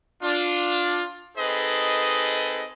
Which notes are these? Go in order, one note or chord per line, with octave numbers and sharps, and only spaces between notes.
D4 F4
C4 D#4 G#4 A4 B4 D#5